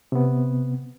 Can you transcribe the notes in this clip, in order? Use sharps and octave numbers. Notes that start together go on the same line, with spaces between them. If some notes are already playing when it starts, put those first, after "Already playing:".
C3 B3